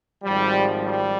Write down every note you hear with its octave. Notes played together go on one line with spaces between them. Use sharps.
G#1 G#2 F3 G3
G3